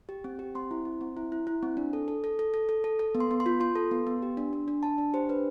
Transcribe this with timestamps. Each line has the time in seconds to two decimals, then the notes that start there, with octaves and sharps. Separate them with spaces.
0.09 G4
0.24 C4
0.39 G4
0.55 C4 C6
0.71 E4
0.85 C4
1.01 C4
1.17 E4
1.32 E4
1.47 E4
1.63 C4
1.77 D4
1.93 A4
2.08 A4
2.24 A4
2.39 A4
2.54 A4
2.69 A4
2.84 A4
2.99 A4
3.15 B3
3.20 C6
3.31 B3
3.40 C6
3.46 F4
3.60 F4 C6
3.76 A4
3.91 B3
4.07 B3
4.22 G4
4.37 D4
4.53 D4
4.68 D4
4.83 D4 A5
4.98 D4
5.13 G4 C5
5.29 D4 B4